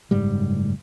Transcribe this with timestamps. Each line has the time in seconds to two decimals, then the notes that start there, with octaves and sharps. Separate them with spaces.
0.11 F#1 G#2 G3